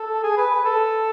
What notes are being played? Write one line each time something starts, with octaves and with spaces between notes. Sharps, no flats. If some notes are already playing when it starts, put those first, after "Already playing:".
Already playing: A4
G#4
B4
B4
A4